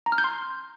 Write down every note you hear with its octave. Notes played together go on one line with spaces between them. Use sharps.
A#5
F6
G6
C6